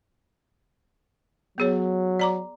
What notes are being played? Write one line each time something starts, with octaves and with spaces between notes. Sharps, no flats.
F#3 B3 G#4 C#5
D5 A#5 D6